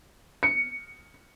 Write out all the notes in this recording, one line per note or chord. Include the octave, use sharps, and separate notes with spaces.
C#7